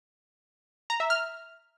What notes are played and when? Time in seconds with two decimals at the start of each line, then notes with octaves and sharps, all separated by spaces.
0.90 A#5
1.00 E5
1.10 F6